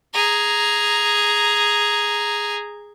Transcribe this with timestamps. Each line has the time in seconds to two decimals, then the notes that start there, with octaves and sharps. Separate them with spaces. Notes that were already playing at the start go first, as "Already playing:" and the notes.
0.14 G#4 A#5